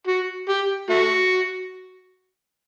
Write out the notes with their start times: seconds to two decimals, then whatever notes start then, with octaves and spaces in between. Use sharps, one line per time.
0.07 F#4
0.49 G4
0.90 A3 F#4